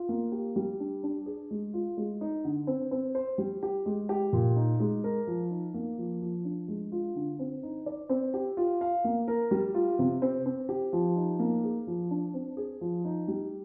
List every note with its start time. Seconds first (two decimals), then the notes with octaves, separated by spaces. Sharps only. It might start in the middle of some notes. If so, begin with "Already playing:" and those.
Already playing: F4
0.09 A#3
0.32 G4
0.56 G3
0.80 D4
1.03 D4
1.26 G#4
1.51 G#3
1.74 F4
1.97 G#3
2.21 D#4
2.45 D3
2.67 C4
2.91 C4
3.15 C5
3.38 G3
3.63 G4
3.86 G#3
4.09 G4
4.33 A#2
4.56 D#4
4.80 G#3
5.04 A#4
5.27 F3
5.51 D#4
5.74 A#3
5.98 F3
6.21 F3
6.45 D4
6.68 G#3
6.92 F4
7.15 D3
7.39 C4
7.63 D#4
7.86 D5
8.09 C4
8.34 G4
8.57 F4
8.81 F5
9.04 A#3
9.28 A#4
9.51 G3
9.74 F4
9.99 C3
10.22 C4
10.46 C4
10.69 G4
10.93 F3
11.16 D#4
11.39 A#3
11.63 G#4
11.87 F3
12.11 D4
12.34 C4
12.57 G#4
12.81 F3
13.05 D#4
13.28 G3